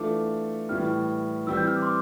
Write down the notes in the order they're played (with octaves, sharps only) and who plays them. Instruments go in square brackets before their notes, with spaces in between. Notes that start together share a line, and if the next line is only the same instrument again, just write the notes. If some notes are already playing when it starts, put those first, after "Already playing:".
Already playing: [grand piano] E3 A3 D4 F4 A4 [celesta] D6
[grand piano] A2 E3 G3 [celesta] F6
[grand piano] E3 G3 C4 [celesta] E6
[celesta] G6
F6
D6
C6
D6